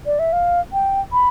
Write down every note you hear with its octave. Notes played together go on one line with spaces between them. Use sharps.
D5
E5
F5
G5
B5